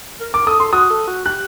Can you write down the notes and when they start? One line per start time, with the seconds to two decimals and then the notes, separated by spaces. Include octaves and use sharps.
0.20 A#4
0.34 A#4 D6
0.47 A4 D#6
0.60 A4 C6
0.73 F#4 D#6
0.90 A4
1.07 F#4
1.25 G4 F#6